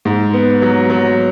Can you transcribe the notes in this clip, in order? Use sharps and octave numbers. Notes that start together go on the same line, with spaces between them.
G#2
B3
F#3
F#3